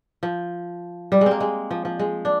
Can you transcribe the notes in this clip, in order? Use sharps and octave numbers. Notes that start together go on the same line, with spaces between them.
F3
G3
G#3
A#3 C4
G#3
F3
F3
G#3
D4